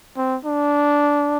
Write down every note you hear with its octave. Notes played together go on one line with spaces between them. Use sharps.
C4
D4